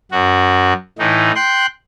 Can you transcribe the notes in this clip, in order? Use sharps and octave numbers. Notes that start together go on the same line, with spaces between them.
F#2 F#4
A2 E3 D#4
G5 C6 F#6